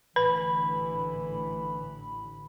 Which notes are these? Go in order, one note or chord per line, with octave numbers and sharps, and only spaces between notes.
A1 A2 D3 E3 B4 B5